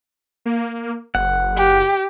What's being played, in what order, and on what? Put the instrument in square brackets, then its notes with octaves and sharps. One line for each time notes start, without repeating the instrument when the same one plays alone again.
[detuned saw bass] A#3
[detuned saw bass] F#1 [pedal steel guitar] F#5
[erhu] G4